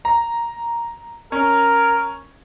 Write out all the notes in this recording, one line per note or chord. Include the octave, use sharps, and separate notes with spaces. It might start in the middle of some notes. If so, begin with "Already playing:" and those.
A#5
C#4 A#4